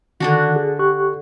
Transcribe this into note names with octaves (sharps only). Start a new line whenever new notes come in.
D3 D#3 D4 F#4
G#4
G4 C#6 F#6